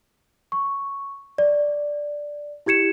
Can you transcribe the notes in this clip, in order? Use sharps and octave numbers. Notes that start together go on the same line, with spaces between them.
C#6
D5
E4 G4 G#6 C#7 E7